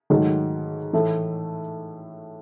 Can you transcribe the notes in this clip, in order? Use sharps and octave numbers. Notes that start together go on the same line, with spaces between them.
G#2 D#3 F#3 A3
A2 E3 A3